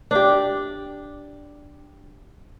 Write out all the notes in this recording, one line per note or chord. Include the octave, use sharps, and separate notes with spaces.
D4 G4